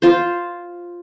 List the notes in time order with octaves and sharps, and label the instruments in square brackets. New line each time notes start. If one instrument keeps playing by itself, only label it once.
[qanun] F4 C5